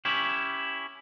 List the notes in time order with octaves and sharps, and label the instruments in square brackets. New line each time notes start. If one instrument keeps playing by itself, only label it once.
[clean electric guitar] C#4 E4 G4